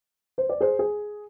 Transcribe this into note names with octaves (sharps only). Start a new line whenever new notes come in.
C5
D5
G#4 C5
G#4